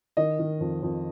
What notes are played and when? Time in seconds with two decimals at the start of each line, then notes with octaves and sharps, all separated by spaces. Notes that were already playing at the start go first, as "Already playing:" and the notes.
0.17 D#3 D#5
0.39 D#3
0.61 F2
0.83 F2